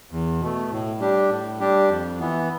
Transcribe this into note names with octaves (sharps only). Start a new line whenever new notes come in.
E2
B2 A3
A2
G3 D4 G4
A2
G3 D4 G4
F2
E3 B3